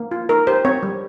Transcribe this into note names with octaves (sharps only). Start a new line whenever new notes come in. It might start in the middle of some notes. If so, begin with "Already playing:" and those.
Already playing: A#3
F4
D#4 A#4
G4 C5
C4 C#5
G3